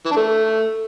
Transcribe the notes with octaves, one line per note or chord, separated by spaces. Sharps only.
E3
D4
A3